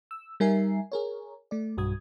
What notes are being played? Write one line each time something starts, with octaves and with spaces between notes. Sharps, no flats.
E6
G3 D#4 A#4 E5 G#5 C7
G#4 A#4 C#5
A3 D5
B1 G2 F#4 D#6 G#6